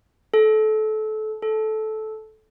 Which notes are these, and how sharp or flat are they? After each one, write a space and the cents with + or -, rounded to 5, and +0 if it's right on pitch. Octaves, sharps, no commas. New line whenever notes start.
A4 -25
A4 -15